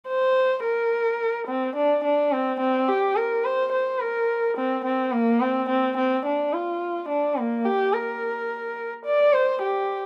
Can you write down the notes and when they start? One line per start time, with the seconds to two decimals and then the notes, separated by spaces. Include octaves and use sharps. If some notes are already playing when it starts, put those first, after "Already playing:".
0.09 C5
0.64 A#4
1.48 C4
1.76 D4
2.04 D4
2.32 C4
2.60 C4
2.88 G4
3.16 A#4
3.45 C5
3.72 C5
4.00 A#4
4.57 C4
4.85 C4
5.12 A#3
5.41 C4
5.70 C4
5.98 C4
6.26 D4
6.54 F4
7.09 D4
7.38 A#3
7.65 G4
7.93 A#4
9.06 D5
9.33 C5
9.62 G4